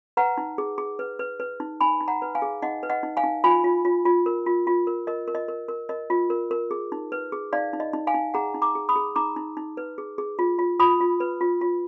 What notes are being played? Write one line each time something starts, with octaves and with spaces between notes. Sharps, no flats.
B4 F#5 A#5
D#4
G#4
G#4
B4
B4
B4
D#4
D#4 G#5 B5
D#4
F#5 A#5
B4
F5 G#5
G#4
D#4 D#5 F#5
B4
D#5 F#5
D#4
F5 G#5
D#4
F4 G#5 B5
F4
F4
F4
A#4
F4
F4
A#4
A#4 D#5
A#4
D#5
A#4
A#4
A#4 D#5
F4
A#4
A#4
G#4
D#4
B4
G#4
D#4 D5 F5
D#4
D#5
D#4
F5 G#5
D#4
G#4 F#5 A#5
D#4
A#5 D6
G#4
B5 D#6
G#4
D#4 A#5 D6
D#4
D#4
B4
G#4
G#4
F4
F4
F4 B5 D#6
F4
B4
F4
F4